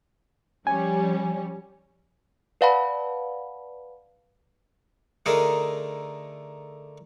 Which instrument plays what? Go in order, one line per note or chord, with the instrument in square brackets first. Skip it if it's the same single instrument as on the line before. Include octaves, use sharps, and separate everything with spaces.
[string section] F3 G3 C#4 [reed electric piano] G#5
[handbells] B4 D5 F5 F#5 A5 B5
[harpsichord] D3 A3 D#4 G#4 A#4